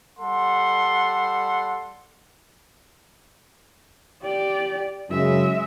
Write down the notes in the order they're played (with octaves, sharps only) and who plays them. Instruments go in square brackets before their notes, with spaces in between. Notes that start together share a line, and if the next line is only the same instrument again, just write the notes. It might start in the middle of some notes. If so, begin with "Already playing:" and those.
[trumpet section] G3 A4 F#5 C6
[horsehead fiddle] G4 D5
[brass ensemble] F#2 C#3 [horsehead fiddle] G#3 E5